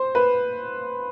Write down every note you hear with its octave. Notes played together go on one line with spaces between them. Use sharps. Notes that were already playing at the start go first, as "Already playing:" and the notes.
Already playing: C5
B4